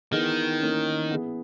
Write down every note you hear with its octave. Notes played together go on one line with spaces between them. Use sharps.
D#3 E3 B3 D#4 G#4
E3 A#3 C#4
E3 B3 E4 G#4